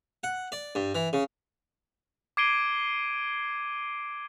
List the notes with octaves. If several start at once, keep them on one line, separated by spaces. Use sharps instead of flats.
F#5
D5
G2
E3
C#3
D6 G#6 C7 D7 D#7 G7